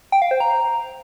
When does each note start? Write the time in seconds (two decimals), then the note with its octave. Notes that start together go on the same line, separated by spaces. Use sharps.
0.12 G5
0.22 F5
0.31 C5
0.40 A#5